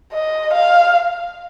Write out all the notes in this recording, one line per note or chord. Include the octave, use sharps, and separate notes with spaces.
D#5
F5